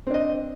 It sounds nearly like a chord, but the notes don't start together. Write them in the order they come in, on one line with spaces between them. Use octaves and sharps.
C4 D4 D#5